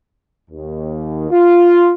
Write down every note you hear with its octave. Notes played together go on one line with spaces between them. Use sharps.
D#2
F4